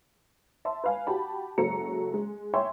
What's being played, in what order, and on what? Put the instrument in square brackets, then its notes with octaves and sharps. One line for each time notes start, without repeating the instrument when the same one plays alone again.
[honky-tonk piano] E5 A5 C6
B4 F5 G#5
F#4 G4 A5 B5
F#1 F#3 G#3 A4 A#5 C#7
G#3
C#5 E5 G5 G#5 C6